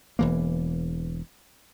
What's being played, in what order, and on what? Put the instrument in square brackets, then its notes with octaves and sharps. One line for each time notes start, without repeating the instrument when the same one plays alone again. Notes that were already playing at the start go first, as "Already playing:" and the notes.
[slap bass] E1 E3 A#3